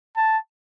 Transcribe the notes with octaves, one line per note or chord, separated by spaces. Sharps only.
A5